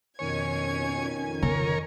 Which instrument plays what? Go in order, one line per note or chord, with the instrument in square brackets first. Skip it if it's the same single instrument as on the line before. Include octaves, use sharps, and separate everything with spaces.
[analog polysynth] F2 D#3 G#5 [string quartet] B2 C#4 G#6 [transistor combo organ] C#5
[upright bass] C#3 [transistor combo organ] A#4 C#5